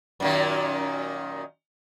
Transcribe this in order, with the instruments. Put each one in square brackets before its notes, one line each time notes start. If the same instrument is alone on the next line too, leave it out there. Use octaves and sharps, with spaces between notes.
[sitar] F#2 A#2 D#3